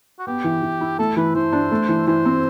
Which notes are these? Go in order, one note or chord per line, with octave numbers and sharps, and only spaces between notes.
F#4
B3 G4
E3
E3
E4
A3 A4
E3 B4
E3 C5
D4
A3
E3
E3 C5
C4